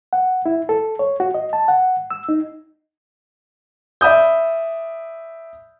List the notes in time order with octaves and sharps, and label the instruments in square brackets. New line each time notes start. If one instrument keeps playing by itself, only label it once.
[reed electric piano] F#5
E4
A4
C#5
F#4
D#5
A5
F#5
E6
D#4
[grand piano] D5 E5 B5 D#6 G6